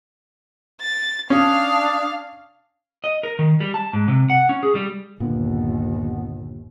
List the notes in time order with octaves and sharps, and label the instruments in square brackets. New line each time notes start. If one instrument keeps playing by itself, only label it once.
[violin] A6
[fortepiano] C#4 [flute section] D4 D#6 [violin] F5
[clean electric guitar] D#5
A#4
D#3
G3
A5
G#2
C3
F#5
C#4
G#4
G3
[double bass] G1 D#2 [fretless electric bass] A#2 D3 [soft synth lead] B3